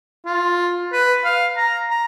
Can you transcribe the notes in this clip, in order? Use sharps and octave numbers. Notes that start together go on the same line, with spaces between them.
F4
B4
F5
A#5
A#5